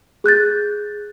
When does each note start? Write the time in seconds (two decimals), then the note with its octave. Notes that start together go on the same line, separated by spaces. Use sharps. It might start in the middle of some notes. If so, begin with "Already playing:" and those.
0.24 G#4 F#6 G6 A6